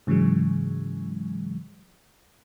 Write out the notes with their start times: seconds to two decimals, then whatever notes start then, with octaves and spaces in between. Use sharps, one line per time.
0.07 G#2 C#3 E3 F#3 G#3